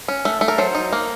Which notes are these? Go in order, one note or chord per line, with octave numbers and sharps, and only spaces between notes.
C#4
A3
A3
A#4
F#3 C5
D#4
A#3